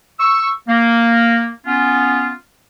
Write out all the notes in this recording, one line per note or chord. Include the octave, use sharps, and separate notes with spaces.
C#6 E6
A#3
B3 C#4 F4